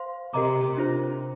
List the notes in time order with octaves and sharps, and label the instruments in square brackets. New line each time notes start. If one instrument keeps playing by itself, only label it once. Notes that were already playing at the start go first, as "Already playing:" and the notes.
Already playing: [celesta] C5 F5 C6
[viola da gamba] C3 [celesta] G4 A#4 D#5 A#5 D6
[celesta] D4 F4 C5